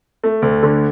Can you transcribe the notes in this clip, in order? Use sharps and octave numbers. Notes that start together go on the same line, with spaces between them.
A3
D2
D3